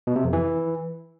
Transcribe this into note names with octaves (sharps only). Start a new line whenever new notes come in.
B2
C3
F2
E3